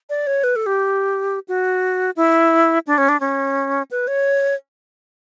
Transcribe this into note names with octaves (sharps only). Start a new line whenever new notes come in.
D5
C#5
B4
A4
G4
F#4
E4
D4
C#4
D4
C#4
B4
C#5